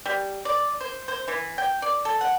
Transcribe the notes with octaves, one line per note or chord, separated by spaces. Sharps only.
G3
D5
C5
C5
E3
G5
D5
A4
F#5